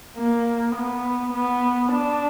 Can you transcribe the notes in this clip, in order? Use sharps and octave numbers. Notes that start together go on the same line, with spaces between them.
A#3
B3
B3
D4